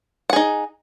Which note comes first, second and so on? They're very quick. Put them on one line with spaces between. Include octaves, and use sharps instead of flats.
F#5 G#4 D#4